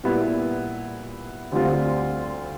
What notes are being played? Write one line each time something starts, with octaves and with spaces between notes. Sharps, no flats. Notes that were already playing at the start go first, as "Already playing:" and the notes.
A#2 G3 B3 E4
D2 D3 G3 C4 F4